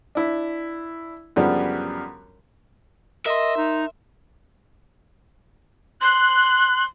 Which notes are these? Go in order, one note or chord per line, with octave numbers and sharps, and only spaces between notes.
D4 E4
F#2 C#3 F3 G3 B3 D4
A#4 D#5 E5 C6
D#4
C6 F#6